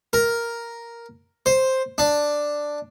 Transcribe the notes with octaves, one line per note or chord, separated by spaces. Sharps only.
A#4
C5
D4